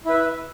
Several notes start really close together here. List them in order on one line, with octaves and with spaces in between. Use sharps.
E4 B4 E5